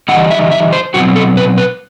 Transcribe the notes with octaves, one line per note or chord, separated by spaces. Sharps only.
E3 G3 D#4 F#5
E5
E5
C5
B2 F#3 C4 F#4
A4
B4
B4